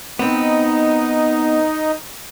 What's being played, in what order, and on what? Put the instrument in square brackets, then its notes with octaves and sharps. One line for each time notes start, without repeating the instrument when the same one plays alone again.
[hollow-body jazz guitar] B3 C4 [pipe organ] D#4